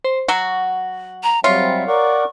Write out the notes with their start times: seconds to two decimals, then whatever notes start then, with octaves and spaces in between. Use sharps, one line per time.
0.04 C5
0.28 F#3 F#4 F#5
1.23 A#5
1.44 F#3 G3 C4 F4 C#5 E5
1.88 A#4 D5 F#5 C#6